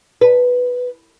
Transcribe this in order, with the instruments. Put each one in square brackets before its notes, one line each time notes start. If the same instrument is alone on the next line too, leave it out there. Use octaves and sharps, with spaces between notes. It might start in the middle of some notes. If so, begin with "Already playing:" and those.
[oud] B4